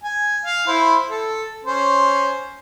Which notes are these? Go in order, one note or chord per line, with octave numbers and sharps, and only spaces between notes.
G#5
F5
E4 C5
A4
C#4 C5